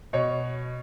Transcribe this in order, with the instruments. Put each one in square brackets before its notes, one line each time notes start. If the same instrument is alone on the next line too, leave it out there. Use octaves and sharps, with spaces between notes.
[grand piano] B2 C#5